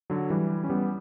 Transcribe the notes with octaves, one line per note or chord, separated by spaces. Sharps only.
D3 F#3
E3 G3
C#4
G3 B3